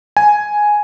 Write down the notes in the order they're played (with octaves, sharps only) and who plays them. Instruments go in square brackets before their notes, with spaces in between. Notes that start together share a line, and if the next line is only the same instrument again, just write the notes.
[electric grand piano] G#5